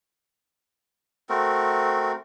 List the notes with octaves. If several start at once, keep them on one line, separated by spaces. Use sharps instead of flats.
A3 C4 F#4 A#4